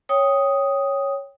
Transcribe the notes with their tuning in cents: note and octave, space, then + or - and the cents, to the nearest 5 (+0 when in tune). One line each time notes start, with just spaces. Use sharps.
C#5 +0 G5 +0 D#6 +5